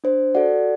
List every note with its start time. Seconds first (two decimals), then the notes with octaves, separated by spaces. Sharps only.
0.04 D4 C5
0.35 F#4 A4 D5 F#5